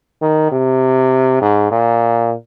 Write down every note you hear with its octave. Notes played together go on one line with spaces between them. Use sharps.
D#3
C3
G#2
A#2